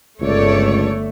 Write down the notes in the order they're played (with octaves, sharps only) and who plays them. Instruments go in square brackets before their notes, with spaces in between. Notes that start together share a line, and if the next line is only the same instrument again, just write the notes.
[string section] G1 A3 [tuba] C#2 [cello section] C#5 D5